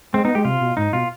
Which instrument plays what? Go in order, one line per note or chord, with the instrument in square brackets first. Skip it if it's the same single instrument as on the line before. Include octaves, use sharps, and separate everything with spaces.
[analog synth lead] G#3 [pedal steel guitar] C4
[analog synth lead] B3 [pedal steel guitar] D#4
[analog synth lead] G#3 [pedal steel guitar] G4
[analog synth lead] C3 [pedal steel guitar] F4
[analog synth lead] B2
[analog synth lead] G#2 [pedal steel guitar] D#4
[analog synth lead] B2 [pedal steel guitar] F4